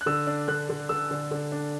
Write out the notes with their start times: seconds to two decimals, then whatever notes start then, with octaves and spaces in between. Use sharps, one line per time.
0.01 F#6
0.06 D3 E6
0.27 D4
0.48 D3 F#6
0.69 D3
0.89 D3 E6
1.11 D3
1.31 D3
1.52 D4